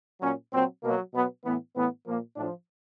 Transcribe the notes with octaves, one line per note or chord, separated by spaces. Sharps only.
A#2 F#3 C#4
A#2 F#3 C4
B2 F#3 A#3
B2 F#3 B3
A2 E3 B3
A2 E3 B3
A#2 F3 A#3
A2 F3 D4